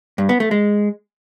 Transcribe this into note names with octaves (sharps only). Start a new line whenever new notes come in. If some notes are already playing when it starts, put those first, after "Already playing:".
G2
B3
A3
G#3